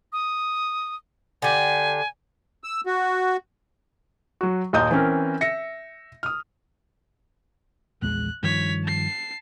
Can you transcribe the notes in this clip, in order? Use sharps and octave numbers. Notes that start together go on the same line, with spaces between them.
D#6
D3 G4 G#5
E6
F#4
F#3 F#4
D#2 A#2 D#5 A#5 D#6 G6
E3 C4 C#4 A#4
E5 A#6 C#7
D#6 F6
A#1 E2 G#3 F#6
G2 D#3 F3 C#5 B6
A5 C7